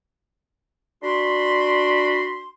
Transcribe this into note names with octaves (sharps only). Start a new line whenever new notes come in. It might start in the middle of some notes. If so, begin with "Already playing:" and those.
D4 F#4 B5 C6